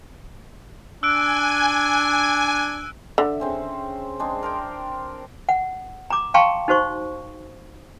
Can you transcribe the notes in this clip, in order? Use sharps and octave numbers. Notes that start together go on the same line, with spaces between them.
D4 G#5 E6 F#6 D7
D3 E5
C#3 C4 C#4
G#3 C4 D4
A#4 C5 G5
F#5
A#5 D6
F5 G5 A5 A#5 C6 C#6
D#4 F#4 C5 C#6